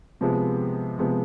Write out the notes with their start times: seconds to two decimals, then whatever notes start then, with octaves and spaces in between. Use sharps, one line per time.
0.21 C3 F3 G#3 B3
0.99 C3 F3 G#3 B3